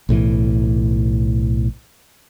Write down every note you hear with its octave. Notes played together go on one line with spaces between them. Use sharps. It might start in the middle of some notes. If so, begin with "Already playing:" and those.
B1 A2 E3